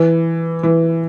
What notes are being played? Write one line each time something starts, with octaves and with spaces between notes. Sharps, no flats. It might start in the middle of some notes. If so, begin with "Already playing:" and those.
Already playing: E3
E3